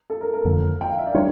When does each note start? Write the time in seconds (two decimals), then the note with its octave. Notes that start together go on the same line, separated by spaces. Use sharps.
0.10 A4
0.21 A#4
0.34 A#4
0.45 F2 D3 F3 A#3
0.81 G5
0.89 F5
0.98 E5
1.06 D5
1.14 G3 D4 C#5